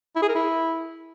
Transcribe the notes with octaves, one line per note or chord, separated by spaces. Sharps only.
E4
G#4
A#4
E4